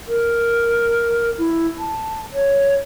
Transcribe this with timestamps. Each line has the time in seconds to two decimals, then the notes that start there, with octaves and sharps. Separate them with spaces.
0.08 A#4
1.38 E4
1.79 A5
2.33 C#5